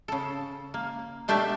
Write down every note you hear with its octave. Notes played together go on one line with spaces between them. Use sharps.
C#3 A4
A#3
B2 A3 D4 G4 E5 A5